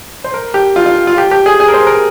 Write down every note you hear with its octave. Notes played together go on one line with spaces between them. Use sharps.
C5
A#4
G4
F4
F4
F4
G4
G4
G#4
G#4
A#4
C5
A#4